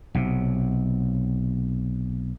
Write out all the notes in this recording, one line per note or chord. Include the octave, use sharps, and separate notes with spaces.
B1 C3